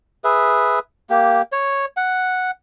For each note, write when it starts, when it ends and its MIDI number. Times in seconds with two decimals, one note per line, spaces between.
0.24 0.79 68
0.24 0.79 71
0.24 0.79 76
1.10 1.42 58
1.10 1.42 67
1.52 1.86 73
1.97 2.51 78